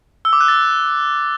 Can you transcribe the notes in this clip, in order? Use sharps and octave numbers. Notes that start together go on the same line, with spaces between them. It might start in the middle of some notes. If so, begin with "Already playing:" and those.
E6
D6
F#6
A6